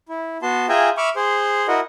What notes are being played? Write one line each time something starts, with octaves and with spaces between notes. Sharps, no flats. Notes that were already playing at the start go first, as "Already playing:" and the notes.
E4
B3 F#4 A5 C6
F4 G#4 E5 G5 G#5 A#5
E5 B5 C#6 D6 F6
G#4 C5 C6
E4 F#4 A#4 D#5 F#5